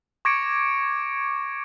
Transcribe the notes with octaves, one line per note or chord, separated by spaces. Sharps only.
C#6 D6 G#6 A#6 C#7 D7